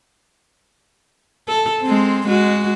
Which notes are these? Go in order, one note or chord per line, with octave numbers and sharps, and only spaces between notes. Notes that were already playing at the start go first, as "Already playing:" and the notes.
A4
G#3 C4
G#3 F#4